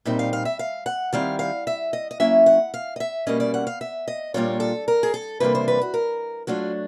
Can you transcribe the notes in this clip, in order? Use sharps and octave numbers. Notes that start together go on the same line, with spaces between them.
A#2 G3 C4 D#4 E5
F5
F5
E5
F5
F#5
D#3 G3 C4 E4 F5
F5
E5
D#5
D#5
F#3 A#3 C#4 E4 E5
F#5
F5
D#5
E5
B2 G3 A#3 C#4 D#5
D5
F#5
F5
E5
D#5
A#2 G3 A#3 D4 F4 C#5
A4
A#4
G#4
A4
C3 E3 G3 A#3 D4 B4
C5
B4
F#4
A#4
F#3 A3 D4 F4 F#4